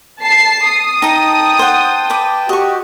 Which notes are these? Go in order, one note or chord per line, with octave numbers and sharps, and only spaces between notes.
A5 C7
D#6
D#4 G5 A5 A#5
C5 F#5
B4 D6
F#4 G4 D#5 C#6